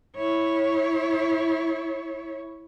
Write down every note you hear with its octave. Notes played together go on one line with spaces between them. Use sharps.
E4 C#5